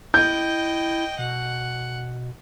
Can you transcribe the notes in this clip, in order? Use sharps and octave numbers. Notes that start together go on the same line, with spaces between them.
E4 D#5 G5 G6
B2 F#5